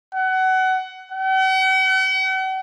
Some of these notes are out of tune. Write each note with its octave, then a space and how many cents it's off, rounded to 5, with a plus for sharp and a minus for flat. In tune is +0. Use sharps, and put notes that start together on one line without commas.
F#5 +25
F#5 +45